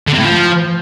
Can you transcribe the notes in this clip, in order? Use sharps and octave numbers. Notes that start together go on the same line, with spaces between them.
D3
C3
A2
F3